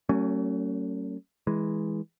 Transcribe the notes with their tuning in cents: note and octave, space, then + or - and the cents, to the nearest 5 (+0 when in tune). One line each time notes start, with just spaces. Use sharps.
F#3 +40 A3 +45 C#4 +0
E3 -15 G#3 +0